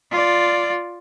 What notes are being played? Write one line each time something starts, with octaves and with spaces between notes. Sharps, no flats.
F4 D5